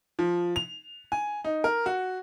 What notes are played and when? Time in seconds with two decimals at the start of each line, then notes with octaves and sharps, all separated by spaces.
0.19 F3
0.56 F7
1.12 G#5
1.44 D#4
1.64 A#4
1.86 F#4